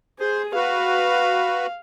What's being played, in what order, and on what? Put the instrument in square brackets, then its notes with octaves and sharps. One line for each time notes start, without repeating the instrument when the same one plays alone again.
[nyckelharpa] G#4 [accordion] C5
[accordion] F#4 B4 [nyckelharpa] F5